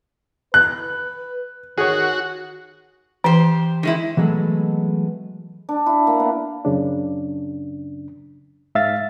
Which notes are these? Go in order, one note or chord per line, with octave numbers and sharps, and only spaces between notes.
B4 F#6
D#3 F#4 G#4 C#5
E3 G4 C5
D#3 G#3 E4
E3 F#3 G#3 A3 B3
D4
E4
A#3
B3
F#2 C#3 D4
G#2 E5 F5 A6